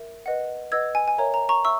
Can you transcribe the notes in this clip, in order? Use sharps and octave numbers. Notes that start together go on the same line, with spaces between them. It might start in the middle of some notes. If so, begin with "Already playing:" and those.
Already playing: A#4 E5
B4 D#5 F#5
B4 D#5 F#5 E6 G#6
G#5
G#5
A#4 C#5 E5 A#5
A#5
A#5 C#6
E5 C#6 E6